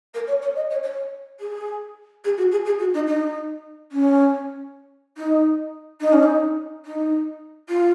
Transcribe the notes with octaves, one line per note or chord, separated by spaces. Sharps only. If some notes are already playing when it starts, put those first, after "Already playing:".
A#4
C#5
C#5
D#5
C#5
C#5
G#4
G#4
F#4
G#4
G#4
F#4
D#4
D#4
C#4
D#4
D#4
C#4
D#4
D#4
F4